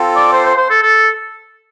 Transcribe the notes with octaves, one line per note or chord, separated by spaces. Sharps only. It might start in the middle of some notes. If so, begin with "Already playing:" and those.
Already playing: C4 F4 A4
D5
C5
C5
C5
A4
A4